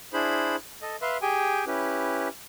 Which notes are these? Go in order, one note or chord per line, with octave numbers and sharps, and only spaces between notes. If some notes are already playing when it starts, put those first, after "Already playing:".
D4 E4 G#4 C5 B5
A4 D#5
B4 E5 F5 C6
G4 G#4 G5 G#5
C#4 E4 G4 B4